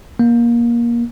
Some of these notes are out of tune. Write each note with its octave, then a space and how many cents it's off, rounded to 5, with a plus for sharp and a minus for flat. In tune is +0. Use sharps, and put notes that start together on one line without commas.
A#3 +20